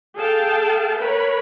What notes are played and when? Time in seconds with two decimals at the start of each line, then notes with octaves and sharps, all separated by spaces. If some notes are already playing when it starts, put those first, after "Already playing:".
0.16 G#4 A4 F5 G5 A5
1.00 A#4 B4 C#5 B5